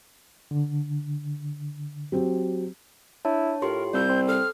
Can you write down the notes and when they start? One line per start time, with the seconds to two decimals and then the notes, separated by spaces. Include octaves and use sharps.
0.51 D3
2.12 F#3 C4 G4
3.25 D4 E4 C#5 A5
3.62 A2 F4 G4 A#4 C6
3.93 C2 D5 E6 G6
4.09 C4 C6
4.28 A4 F6